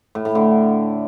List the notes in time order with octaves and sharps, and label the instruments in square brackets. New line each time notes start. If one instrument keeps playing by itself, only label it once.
[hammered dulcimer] A2
A2
D3